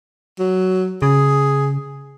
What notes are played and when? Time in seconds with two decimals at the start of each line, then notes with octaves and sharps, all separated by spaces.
0.39 F#3
1.02 C#3 G#4